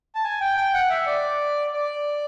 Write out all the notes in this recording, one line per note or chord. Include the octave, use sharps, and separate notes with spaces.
A5
G#5
G5
G5
F#5
E5
D5
D5